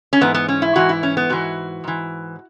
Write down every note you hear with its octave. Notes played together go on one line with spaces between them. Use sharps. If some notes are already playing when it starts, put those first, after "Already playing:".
C#4
G#2 E3 B3
B3
C#4
E4
G#2 E3 F#4
E4
C#4
B3
G#2 E3 F#4
G#2 E3